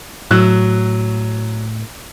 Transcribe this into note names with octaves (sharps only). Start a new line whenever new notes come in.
A2 F#3 E6 F#6